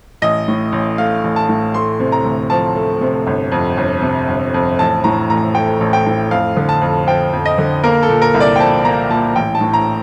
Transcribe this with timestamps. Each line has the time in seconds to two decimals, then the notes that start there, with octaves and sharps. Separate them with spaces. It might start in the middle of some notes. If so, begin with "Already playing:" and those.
0.22 A1 D#5
0.48 A2
0.72 A1
0.98 A3 F5
1.24 A1
1.36 A5
1.49 A2
1.74 A3 C6
2.00 C3
2.12 A#5
2.24 D2
2.50 F3 A5
2.76 A3
3.01 C3
3.27 G1
3.52 F2
3.77 G1
4.02 C3
4.28 G1
4.54 F2
4.79 A1 A5
5.04 A2 A#5
5.30 A1 A#5
5.55 A3 G5
5.80 A1
5.93 G5
6.06 A2
6.31 F2 F5
6.57 D3
6.69 A5
6.81 F2
7.07 F3 G5
7.33 F2
7.46 D#5
7.58 D3
7.83 A#3 A#4
8.03 A4
8.09 A#2
8.22 A#4
8.34 C2
8.40 D5
8.56 G5
8.59 F3 A5
8.85 A#3 A#5
9.10 A#2 A5
9.36 A1 G5
9.55 A5
9.61 A2
9.73 A#5